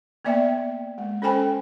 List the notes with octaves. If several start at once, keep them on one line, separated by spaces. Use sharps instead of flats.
A#3 B3 D5 E5 G5
G#3
C#4 A4 C5 G5 G#5 B5